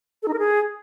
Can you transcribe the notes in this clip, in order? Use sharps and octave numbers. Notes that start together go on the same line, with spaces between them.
A4
D#4
A#4
G#4